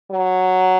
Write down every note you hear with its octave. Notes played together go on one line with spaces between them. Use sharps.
F#3